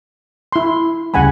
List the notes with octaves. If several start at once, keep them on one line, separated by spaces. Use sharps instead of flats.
E4 C6
D2 C#3 G3 F#5 G#5 B5